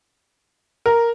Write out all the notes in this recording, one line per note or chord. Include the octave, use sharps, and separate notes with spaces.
A#4